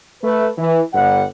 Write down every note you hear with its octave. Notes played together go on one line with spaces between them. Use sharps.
A3 B4
E3
G1 G3 F#5